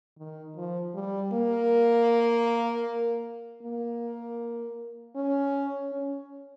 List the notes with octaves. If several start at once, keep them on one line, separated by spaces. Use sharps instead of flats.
D#3
F3
G3
A#3
A#3
C#4
C#4